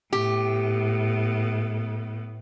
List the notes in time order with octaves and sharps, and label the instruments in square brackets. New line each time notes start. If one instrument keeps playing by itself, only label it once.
[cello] A2 B3 [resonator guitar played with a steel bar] G4